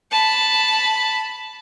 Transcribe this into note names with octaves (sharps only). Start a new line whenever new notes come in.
A5 B5